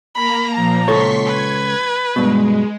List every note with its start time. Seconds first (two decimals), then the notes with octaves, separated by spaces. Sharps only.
0.15 A#3 A#5 B5
0.55 A#2 F3 A#3 A#5
0.88 C#2 A4 C#5 C6 C#6 B6
1.26 B4 G#6
2.16 G2 B2 G#3